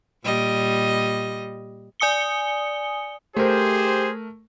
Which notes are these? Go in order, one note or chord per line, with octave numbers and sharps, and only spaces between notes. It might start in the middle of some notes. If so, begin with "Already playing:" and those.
A#2 G3 D#5
D5 G#5 D#6 C#7 G7
A3 G4 G#4 A#4 C5